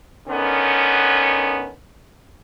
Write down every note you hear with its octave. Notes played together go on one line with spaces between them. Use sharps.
D3 D#3 B3 C#4